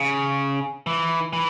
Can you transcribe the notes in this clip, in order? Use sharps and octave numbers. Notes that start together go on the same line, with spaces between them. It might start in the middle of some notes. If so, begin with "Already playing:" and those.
Already playing: C#3
E3
E3